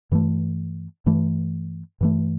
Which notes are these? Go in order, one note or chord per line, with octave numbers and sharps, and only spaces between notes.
G2 E3 A3
G2 E3 A3
G2 E3 A3